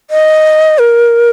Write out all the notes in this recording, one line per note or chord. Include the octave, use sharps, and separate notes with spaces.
D#5
A#4